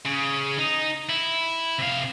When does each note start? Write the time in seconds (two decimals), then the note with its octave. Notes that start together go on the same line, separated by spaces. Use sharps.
0.06 C#3
0.59 D#4
1.09 E4
1.78 C3 F5